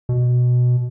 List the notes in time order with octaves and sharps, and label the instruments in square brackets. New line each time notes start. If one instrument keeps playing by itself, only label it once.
[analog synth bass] B2